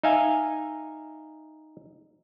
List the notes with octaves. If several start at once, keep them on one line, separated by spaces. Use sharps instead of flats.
D#4 E5 F5 G#5